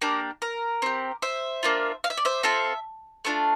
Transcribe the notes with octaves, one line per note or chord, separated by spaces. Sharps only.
A#3 D4 G4 A#4
A#4
C4 G4
C5 E5
A#3 D4 F4
F5
E5
D5
C5 E5
C4 F4 A4
A3 D4 F4